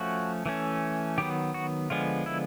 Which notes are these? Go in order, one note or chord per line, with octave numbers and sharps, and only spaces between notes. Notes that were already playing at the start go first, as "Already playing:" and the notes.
Already playing: F3 A3 C#4 F#4
E3 A3 C#4
D#3 F#3 B3 G4
F#4
D3 F3 G#3 B3 F4
E4